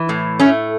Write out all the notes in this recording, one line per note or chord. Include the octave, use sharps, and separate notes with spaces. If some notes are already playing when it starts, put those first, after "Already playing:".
Already playing: E3
A2
A3 C#4